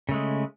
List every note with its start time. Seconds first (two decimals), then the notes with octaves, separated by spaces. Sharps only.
0.09 C#3
0.11 A3
0.14 G#3